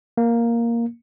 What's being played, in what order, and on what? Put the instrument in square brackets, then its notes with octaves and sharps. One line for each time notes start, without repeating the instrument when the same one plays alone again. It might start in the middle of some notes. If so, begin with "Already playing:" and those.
[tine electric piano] A#3